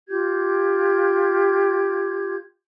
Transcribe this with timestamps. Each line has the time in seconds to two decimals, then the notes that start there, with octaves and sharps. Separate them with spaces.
0.09 F4 G4 G6 G#6